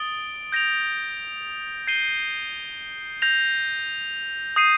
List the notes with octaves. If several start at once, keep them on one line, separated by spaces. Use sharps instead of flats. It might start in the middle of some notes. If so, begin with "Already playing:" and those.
Already playing: D#6 A6 D7 G7
G6 A#6 D7 F7
G6 C7 D#7 G7
G6 A#6 F7
D#6 G6 C7 D#7